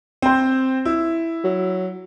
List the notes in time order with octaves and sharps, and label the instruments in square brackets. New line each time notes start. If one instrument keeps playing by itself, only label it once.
[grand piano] C4 C5
E4
[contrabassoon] F#3